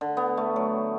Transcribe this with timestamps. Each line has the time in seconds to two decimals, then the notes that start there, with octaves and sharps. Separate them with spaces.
0.01 D3
0.17 B3
0.37 A3
0.56 F#3